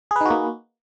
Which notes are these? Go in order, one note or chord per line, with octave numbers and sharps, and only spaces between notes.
A#3 D#4 F#4 G#4 B4